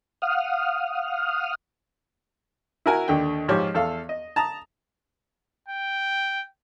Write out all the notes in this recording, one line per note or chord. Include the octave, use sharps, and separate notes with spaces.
F5 F#5 D#6 F6
E4 F#4 A#4 G#5
D#2 D3 G5
G#2 F3 G4 C#5
E2 A4 F5
D#5
A5 A#5 D#6
G5